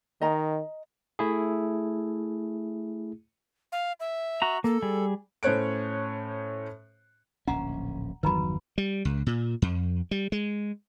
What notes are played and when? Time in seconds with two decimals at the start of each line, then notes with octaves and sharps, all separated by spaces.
0.21 D#3 D#5 A#5
1.19 A3 E4 G#4
3.72 F5
4.00 E5
4.42 F#4 A#5
4.64 A#3 A4
4.82 G3 G#4
5.43 A2 C#4 C5 C#5 F#6 D7
7.47 D1 A#1 C#4 F#5 A#5
8.23 G1 E2 D#3 F#3 B4 A#5 B5
8.78 G3
9.05 C#2
9.26 A#2
9.62 F2
10.11 G3
10.32 G#3